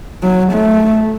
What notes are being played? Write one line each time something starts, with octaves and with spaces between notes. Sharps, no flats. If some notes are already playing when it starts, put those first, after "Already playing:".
F#3
A3